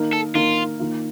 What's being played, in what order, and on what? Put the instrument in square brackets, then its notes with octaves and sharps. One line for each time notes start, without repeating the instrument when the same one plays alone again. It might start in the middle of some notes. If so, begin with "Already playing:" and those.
Already playing: [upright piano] D#3 A#3 D#4 A#4
[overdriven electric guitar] A4
[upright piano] D#3 A#3 D#4 A#4 [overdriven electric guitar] F4
[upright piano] D#3 A#3 F4